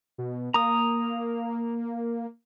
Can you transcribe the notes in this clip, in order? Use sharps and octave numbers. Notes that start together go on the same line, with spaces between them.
B2
A#3 A#5 D#6